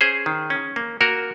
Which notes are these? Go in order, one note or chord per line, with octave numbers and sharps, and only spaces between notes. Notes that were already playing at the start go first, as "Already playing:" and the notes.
C#4 G#4 C5
D#3
C#4
A#3
A#3 F#4 A#4